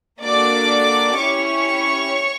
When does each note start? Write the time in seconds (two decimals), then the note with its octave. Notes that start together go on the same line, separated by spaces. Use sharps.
0.21 A#3 D4 F#4 A4 D5 D6
1.17 C#4 E4 G4 C#5 C#6